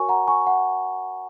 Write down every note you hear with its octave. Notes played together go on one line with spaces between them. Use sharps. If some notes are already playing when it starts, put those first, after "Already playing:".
Already playing: F#4 A#4 C#5 G#5 C#6
F#5 A#5
G#5 C#6
F#5